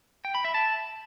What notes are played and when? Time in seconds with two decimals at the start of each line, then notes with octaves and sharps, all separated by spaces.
0.25 G5
0.35 B5
0.45 E5
0.54 A5